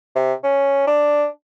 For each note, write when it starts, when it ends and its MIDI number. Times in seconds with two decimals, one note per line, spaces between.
0.16 0.33 48
0.43 0.84 61
0.87 1.26 62